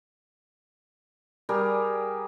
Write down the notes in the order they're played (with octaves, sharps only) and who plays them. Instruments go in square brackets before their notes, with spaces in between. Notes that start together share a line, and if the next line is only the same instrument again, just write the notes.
[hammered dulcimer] G3 G4 G#4 A#4